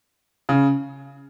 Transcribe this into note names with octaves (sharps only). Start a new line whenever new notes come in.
C#3